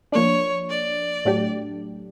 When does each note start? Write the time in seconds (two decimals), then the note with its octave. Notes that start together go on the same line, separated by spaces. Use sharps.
0.12 F3 A#3 D4 C#5
0.69 D5
1.25 A2 F#3 A3 D4 G4